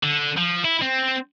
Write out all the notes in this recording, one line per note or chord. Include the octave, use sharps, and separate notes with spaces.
D3
F3
E4
C4